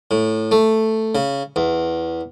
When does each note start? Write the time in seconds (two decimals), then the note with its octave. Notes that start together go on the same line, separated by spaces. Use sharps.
0.11 A2
0.51 A3
1.15 C#3
1.56 E2